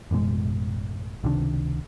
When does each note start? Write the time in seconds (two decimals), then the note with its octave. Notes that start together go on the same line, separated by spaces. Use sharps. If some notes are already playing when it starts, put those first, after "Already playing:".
0.11 A1 F#2 B2 G#3
1.24 C#2 C3 D#3 D4